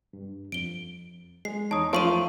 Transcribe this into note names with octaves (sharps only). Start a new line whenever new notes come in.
G2
F2 D7 G7
G#3 C7
E2 D#4 C#5 A5 D#6
F3 A3 F4 A5 C#6 D#7